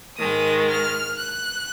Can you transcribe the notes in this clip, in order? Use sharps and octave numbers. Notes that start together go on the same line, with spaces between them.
G#2 D#3 G#3 D#6
F6
F#6